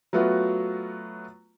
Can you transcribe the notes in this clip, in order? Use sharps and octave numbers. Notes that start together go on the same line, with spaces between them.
F#3 A3 B3 F4 F#4